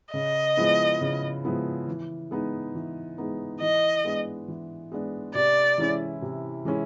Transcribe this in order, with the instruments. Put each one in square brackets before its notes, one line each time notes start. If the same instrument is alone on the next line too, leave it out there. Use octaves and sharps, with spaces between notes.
[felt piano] C#3 [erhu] D#5
[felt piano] F3 G#3 B3 E4
C#3
F3 G#3 B3 E4
E3
G#3 B3 D#4
E3
G#3 B3 D#4
[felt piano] E3 [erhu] D#5
[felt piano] G#3 B3 D4
E3
G#3 B3 D4
[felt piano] C3 [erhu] D5
[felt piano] E3 G#3 C#4 E4
C3
E3 G#3 C#4 E4